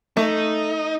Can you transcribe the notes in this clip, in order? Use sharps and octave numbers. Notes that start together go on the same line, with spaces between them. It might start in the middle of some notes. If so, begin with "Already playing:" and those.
A3 D#4